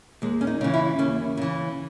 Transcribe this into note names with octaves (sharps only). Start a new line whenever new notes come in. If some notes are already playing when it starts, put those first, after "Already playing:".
D#2 G#3
C#4
D#4
C#3 E3
E4
D#2 C#4
C#3 E3